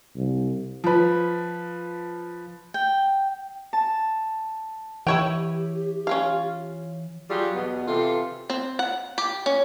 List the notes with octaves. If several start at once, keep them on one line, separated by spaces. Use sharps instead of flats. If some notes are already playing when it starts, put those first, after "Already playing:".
C2
F3 B4
G5
A5
E3 E4 G4 C#5 G5
C#4 F4 F5
F#3 G3 F4 G4 G#4
E2 B2 B3
C3 E3 F4 A4
C4
F#5
G4
C#4